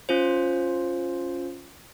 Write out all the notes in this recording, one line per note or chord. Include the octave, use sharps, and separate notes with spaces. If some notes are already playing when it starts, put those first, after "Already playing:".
C#4 F4 C5